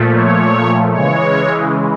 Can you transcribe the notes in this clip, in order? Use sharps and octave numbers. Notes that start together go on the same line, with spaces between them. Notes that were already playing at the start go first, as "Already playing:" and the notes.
Already playing: A#2 F3 A3
C#5
C#3 E3 G#3 C#5